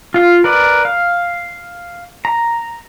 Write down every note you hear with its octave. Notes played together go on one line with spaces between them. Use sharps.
F4 F5
A#4 B4 D5
F5
A#5